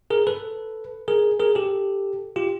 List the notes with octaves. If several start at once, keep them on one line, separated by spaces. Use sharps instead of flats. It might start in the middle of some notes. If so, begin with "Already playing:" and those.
G#4 A#4
A4 B4
G#4 A#4
G#4 A#4
G4 A4
F4 G4